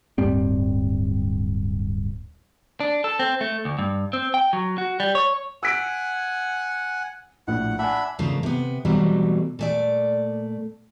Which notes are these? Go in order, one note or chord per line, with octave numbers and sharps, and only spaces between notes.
D1 G2 G3 C4
D4
A4
C4
A3
D2
G2
C4
G5
F#3
F#4
G3
C#5
F#5 G#5 E6 B6 D7
A#1 A2 F#5
D4 E5 F#5 G#5 B5
G#2 C#3 F3 A3 A#3 D4
C3 B3
B2 E3 F#3 G3 A3 C4
A#2 A3 D5